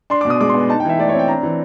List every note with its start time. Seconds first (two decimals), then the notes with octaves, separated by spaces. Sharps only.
0.10 D4 C6
0.21 D6
0.25 B2
0.30 D#6
0.40 G#3 D6
0.49 C6
0.54 B3
0.69 D#4 A5
0.80 G5
0.85 E3 E5
0.99 A3 D5
1.09 C#5
1.14 C4 G5
1.28 D4 A#5
1.43 E3